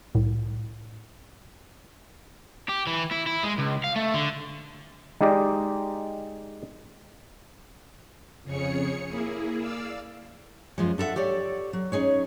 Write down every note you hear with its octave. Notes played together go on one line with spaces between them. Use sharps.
C2 A2
G4
E3
E4
E4
G#3
C#2
F5
A3
D3
G#3 D#4 G4 D5 D#5
F2 C#3 G#4 C#5 C#7
A#3 E4 G#4
D5 F5 E6
F#2 F3 G#3
D4 A4 B4 E5 F#5
G4 A4 C#5 D5
F#3
C#4 D#4 G#4 C#5